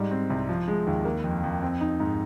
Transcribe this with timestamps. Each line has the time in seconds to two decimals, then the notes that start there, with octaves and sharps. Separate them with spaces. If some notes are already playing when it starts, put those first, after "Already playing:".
Already playing: G#2 G3
0.11 C4
0.30 C2
0.49 F3
0.68 G#3
0.87 D#2
1.05 A#3
1.24 F2
1.44 F2
1.62 C4
1.81 D#4
2.00 G#2